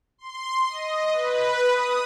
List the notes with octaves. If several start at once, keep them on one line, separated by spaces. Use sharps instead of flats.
C6
D#5
B4
D#6